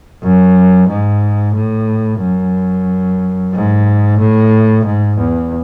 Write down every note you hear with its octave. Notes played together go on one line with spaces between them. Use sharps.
F#2
G#2
A2
F#2
G#2
A2
G#2
E2